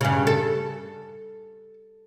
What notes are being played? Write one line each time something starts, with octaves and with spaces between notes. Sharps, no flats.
G2 C#3
A4